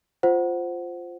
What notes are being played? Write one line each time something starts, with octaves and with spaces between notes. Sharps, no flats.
F4 C5 F#5